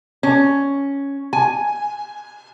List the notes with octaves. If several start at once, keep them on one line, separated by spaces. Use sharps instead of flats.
C#4
G#5